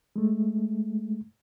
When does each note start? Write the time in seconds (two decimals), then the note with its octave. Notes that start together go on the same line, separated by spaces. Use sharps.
0.16 G#3 A3